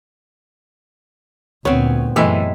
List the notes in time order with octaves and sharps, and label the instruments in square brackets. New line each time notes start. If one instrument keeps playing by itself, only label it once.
[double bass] D2 A#2 [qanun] B3 C4 [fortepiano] C#5
[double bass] F#2 [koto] C3 G#3 E4 [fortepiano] E3 A3 E6